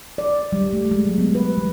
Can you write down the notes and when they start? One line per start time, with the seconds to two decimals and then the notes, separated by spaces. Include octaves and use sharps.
0.18 D5
0.52 G3
0.73 A3
0.91 G#3
1.07 F#3
1.18 B3
1.35 B4
1.57 E3